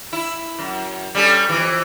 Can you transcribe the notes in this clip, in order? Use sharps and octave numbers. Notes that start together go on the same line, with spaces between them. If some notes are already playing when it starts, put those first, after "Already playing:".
E4
F#2
G3 C#4 A4
F2 E3